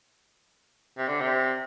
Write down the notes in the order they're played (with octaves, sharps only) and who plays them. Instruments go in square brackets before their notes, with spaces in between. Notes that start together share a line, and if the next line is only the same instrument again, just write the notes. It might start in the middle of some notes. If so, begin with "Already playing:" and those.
[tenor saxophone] C3
D3
C3